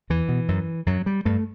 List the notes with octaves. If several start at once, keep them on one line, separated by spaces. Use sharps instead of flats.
E2 E3
B2
F#2
F#2 F#3
G3
G2 A3